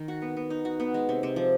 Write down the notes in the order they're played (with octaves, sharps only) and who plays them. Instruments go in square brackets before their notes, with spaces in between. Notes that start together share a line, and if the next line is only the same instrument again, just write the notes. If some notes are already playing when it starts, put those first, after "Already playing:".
Already playing: [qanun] D#3
F#4
B3
B3
D#4
F#4
B3
G#3
C3
C3
F3